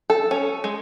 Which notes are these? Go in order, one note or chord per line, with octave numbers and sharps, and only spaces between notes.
A4
C#4
G#3